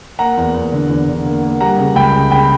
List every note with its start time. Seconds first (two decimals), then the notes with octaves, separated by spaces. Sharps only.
0.19 A#3 F#5 A#5
0.37 E2
0.54 E2
0.72 D3
0.89 E2
1.08 D3
1.25 A#3
1.43 A#3
1.60 G3 F#5 A#5
1.78 C#3
1.95 C#2 G5 B5
2.14 C#3
2.31 C#3 G5 B5